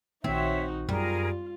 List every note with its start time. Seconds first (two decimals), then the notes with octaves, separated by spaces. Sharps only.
0.24 A#1 D#3 C4 D#4 F#4 C#5 E5
0.89 F#2 G3 F4 G#4 A#4